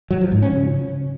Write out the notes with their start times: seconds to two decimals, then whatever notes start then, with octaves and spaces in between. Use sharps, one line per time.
0.11 F#3
0.21 F3
0.32 G#2
0.42 C#4
0.53 C#3